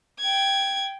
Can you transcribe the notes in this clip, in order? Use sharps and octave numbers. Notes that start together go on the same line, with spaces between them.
G5 G#6